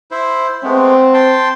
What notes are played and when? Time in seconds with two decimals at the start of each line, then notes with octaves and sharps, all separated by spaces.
0.11 E4 C5
0.63 G#3 A3 B3 C4
1.14 G5 A5 C6